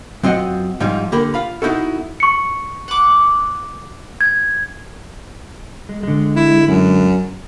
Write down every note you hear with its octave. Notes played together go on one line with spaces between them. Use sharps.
F#2 C4 F4 D#5 F#5
G#2 F3 G3 D#4 F4
D3 A#3 G4 A#4 B5
F4 F5 B5
B3 D#4 E4 F#4 A4
C#6 C#7
F#5 D6
G#6
G#3
D3 G#3
E4
F#2